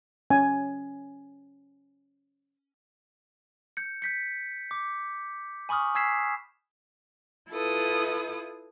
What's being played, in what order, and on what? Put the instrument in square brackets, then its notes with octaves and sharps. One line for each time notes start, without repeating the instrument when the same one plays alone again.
[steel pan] C#4 G#5
[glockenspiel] G6 C#7
G6 B6 C#7
D6
G#5 B5 C#6 D#6 F6
G#5 E6 G#6 B6 C7 E7
[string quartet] E4 F4 A4 B4 D#6